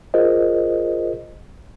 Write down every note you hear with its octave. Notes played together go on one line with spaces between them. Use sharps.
F4 G#4 A#4 C5 D#5